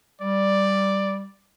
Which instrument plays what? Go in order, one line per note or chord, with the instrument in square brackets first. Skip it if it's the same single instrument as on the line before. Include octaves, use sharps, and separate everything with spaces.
[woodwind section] G3 [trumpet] D5